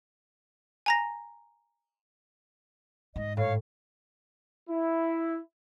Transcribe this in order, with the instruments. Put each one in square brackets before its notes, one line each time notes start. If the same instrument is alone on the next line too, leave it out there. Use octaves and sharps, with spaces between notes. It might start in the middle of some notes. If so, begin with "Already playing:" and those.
[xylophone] G#5 A#5 A#6
[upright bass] G#2 [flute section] D#5
[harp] A2 [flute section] C#5 F5
[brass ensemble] E4